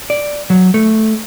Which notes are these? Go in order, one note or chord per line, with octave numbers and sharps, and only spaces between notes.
D5
F#3
A3